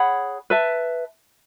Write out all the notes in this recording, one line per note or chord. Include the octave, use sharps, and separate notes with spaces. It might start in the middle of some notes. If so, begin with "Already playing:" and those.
Already playing: G#4 C#5 F#5 B5
B4 E5 A5